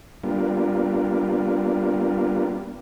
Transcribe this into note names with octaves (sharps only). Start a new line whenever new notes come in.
G3 A#3 B3 D4 F4